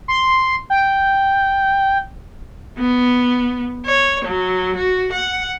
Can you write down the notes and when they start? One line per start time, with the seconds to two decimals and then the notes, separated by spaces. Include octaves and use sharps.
0.08 C6
0.70 G5
2.79 B3
3.86 C#5
4.24 F#3
4.76 F#4
5.12 F#5